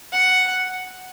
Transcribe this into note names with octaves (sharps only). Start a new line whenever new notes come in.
F#5